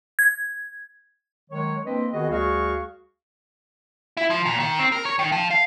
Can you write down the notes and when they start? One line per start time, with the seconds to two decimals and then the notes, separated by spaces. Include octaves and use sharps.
0.19 G#6
1.50 D#3 F#3 G#3 C#5
1.85 A#3 C4 D4 B4 D#5
2.12 D#3 B3 F#4 G#4 D#5
2.30 D2 G3 F#4 G#4 F5 C#6
4.17 E4
4.30 F3
4.45 A#2
4.60 D#3
4.79 C4
4.92 A#4
5.05 C#5
5.19 D#3
5.32 F3
5.51 F5